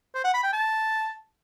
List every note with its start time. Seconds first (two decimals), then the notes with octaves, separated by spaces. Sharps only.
0.15 C5
0.24 F#5
0.34 B5
0.43 G5
0.53 A5